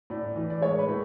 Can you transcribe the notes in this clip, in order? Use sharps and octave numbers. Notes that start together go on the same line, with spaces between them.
A2 D5
E3
D5
G#3 C#5
B4
A2